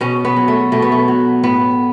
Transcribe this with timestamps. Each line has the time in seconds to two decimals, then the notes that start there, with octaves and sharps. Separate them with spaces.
0.01 B2 C#4
0.25 B3
0.36 F#3
0.48 A3
0.72 B2 A3
0.82 B3
0.92 A3
1.08 F#3
1.43 A2 B3